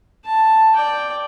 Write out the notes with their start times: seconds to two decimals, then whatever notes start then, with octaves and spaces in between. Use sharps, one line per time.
0.25 A5
0.75 D5 G5